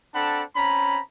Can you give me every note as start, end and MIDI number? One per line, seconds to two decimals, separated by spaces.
0.14 0.42 60
0.14 0.42 62
0.14 0.42 69
0.14 0.42 78
0.14 0.42 81
0.14 0.42 83
0.55 1.00 60
0.55 1.00 61
0.55 1.00 82
0.55 1.00 83